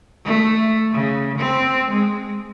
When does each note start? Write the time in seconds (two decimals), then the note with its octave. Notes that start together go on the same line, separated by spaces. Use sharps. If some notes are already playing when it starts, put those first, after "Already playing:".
0.25 A3
0.92 C#3
1.38 C4
1.90 G#3